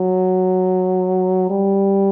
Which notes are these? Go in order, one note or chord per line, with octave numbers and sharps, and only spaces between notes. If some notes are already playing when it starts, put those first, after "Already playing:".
Already playing: F#3
G3